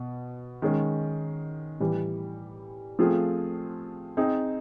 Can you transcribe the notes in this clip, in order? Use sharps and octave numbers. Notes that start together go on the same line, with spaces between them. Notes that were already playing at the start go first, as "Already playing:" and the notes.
Already playing: B2 B3
D#3 G#3 C#4
A2 E3 G3
F3 A3 C4 F4 G#4
C4 D#4 G#4